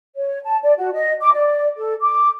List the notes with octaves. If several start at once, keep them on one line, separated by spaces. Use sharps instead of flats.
C#5
A5
D5
F#4
D#5
D6
D5
A4
D6